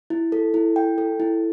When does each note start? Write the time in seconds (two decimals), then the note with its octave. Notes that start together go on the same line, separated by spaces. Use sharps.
0.10 E4
0.32 A4
0.54 E4
0.76 G5
0.98 A4
1.20 E4